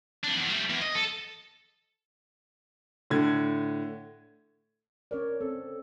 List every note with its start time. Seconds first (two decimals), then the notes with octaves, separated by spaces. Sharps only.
0.24 F2 D4
0.36 E2
0.49 G3 A3
0.70 E2
0.82 D#5
0.95 A4
3.10 A2 D3 G#6
5.11 C#4 A#4 C#5 D5
5.41 C4 A4